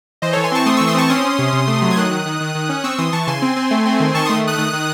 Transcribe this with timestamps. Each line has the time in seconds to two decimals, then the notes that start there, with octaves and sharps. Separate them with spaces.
0.22 E3 C5 D#5
0.33 E3 A4 C#5
0.44 G#5 C6
0.52 C4 A5 C#6
0.66 A3 C6 D#6
0.76 E3 C#6 E6
0.87 C6 D#6
0.95 C4 A5 C#6
1.09 C#4 C6 D#6
1.24 C#4
1.38 C3
1.53 C3
1.67 A3
1.82 F#3
1.91 G#6
1.96 D#3 D#6 F#6
2.11 D#3
2.26 D#3
2.40 D#3
2.55 D#3
2.69 C#4
2.84 C4 C#6 E6
2.98 E3 C6 D#6
3.12 E3 A5 C#6
3.27 C#3 G#5 C6
3.42 C4
3.56 C4
3.71 A3
3.86 C4
4.00 D#3
4.14 D#3 A5 C#6
4.25 A3 C6 D#6
4.43 D#3 D#6 F#6
4.58 D#3
4.73 D#3